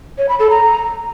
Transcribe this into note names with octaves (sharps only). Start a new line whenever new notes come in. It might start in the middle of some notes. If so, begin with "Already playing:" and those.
C#5
B5
A4
A#5